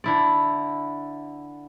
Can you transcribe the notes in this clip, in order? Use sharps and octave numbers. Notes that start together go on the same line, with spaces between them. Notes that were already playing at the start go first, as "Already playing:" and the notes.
D3 E4 D5